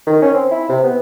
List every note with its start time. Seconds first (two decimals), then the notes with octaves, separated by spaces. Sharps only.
0.07 D#3
0.22 C#4
0.34 C4
0.51 E4
0.69 C3
0.84 B3